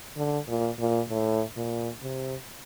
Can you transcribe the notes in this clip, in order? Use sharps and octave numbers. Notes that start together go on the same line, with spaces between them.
D3
A#2
A#2
A2
A#2
C3